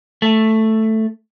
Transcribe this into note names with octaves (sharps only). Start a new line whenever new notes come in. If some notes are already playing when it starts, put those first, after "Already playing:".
A3